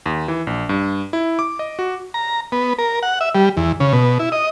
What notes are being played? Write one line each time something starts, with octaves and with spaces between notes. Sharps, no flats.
D#2
E3
A#1
G2
E4
D6
D#5
F#4
A#5
B3
A#4
F#5
E5
G3
E2
C#3
B2
E4
D#5